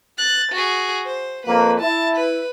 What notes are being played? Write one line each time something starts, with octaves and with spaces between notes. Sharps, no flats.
F#6 A6
F#4 G#4
C5
F2 A#3 B4
E4 A5
B4